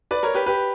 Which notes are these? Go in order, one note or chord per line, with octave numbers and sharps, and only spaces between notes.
B4 D5
A#4 C#5
G4 B4
G4 B4